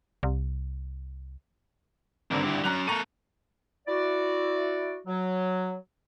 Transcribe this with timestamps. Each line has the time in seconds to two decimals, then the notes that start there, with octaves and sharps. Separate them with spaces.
0.23 C2
2.31 G#1 G2 D3 C4 A#4
2.44 E4 G4
2.64 F#3 C#4 A#5 F#6 F7
2.87 A#3 A4 A#5 C#6 D#7
3.88 E4 F#4 D5
5.07 F#3